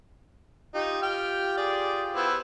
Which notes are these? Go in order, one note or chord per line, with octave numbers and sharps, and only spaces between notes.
D#4 F4 G4
G5 F6
G#4 D5
B3 E4 C5